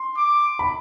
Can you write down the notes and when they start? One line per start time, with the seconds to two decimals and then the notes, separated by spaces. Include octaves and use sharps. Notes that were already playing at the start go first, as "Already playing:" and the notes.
Already playing: C6
0.17 D6
0.59 B5